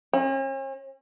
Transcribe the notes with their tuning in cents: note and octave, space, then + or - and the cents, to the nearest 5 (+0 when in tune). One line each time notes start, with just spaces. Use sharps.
C#4 -45